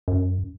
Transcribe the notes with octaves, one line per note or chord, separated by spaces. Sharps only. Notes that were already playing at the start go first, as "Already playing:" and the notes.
F#2